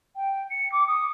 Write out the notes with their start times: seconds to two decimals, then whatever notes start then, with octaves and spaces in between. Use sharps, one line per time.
0.16 G5
0.51 C#7
0.72 D6
0.88 D#6